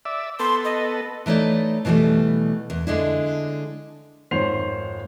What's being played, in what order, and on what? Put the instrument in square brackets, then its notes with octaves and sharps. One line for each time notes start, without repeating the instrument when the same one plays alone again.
[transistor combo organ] D5 E5
[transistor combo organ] B3 A4 [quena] C6
[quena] D#5
[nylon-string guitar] E3 A3 D#4 C#5 D5
B2 D3 E3 G3 A3
E2
D3 G#3 D4 E4
[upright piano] G#1 F2 C5 C#5 C7 F7